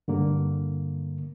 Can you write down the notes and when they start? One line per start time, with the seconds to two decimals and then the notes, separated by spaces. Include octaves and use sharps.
0.08 G2 D3 A#3